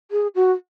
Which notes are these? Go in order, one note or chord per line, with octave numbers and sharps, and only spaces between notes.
G#4
F#4